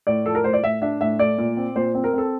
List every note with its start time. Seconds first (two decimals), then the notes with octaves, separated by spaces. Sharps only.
0.07 A2 D5
0.26 F3 A4
0.35 A#4
0.44 A2 C5
0.53 D5
0.63 A2 E5
0.82 D4 E5
1.01 A2 E5
1.19 A3 D5
1.38 A#2
1.57 C4
1.76 A#2 C5
1.95 C4
2.04 A#4
2.13 C4 A4